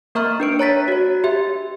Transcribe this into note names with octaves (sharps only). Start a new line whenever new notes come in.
A#3 A#4 E5 A#5 C#6 F6
D4 B4 D7
C#5 A#5 A6 B6
F#4 C#5
G4 E5